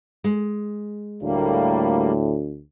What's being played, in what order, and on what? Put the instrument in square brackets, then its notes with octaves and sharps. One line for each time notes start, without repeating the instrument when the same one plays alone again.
[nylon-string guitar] G#3
[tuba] D2 [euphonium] A2 [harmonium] G3 A#3